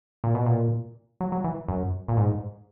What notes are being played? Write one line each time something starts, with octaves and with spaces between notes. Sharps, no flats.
A#2
B2
A#2
F#3
F#3
E3
F#2
A#2
G#2